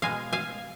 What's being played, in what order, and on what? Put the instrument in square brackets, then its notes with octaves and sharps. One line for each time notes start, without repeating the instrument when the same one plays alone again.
[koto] B2 G#3 F5 G#5
F5 G#5